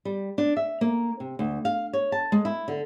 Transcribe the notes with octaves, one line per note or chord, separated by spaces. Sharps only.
G3
D4
E5
A#3
C3
D2
F5
C#5
A5
G#3
E4
D3